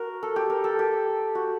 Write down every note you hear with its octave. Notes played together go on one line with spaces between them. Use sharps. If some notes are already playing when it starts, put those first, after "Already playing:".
Already playing: F#4 A#4
A4
G4
A#4
A4
G4
F#4